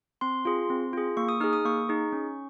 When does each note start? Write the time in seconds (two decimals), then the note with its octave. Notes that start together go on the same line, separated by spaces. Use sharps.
0.21 C4 C6
0.45 F4 G#4
0.70 C4
0.93 F4 G#4
1.17 A#3 C#6
1.29 D#6
1.40 D#4 G#4 F6
1.53 D#6
1.65 A#3 C#6
1.89 D#4 G#4
2.13 C#4